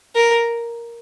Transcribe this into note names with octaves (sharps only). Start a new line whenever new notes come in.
A#4